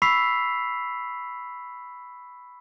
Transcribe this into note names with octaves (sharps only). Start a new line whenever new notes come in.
B5 C#6 E6 B6 C7 F7